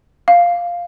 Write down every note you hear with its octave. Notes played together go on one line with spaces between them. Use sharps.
F5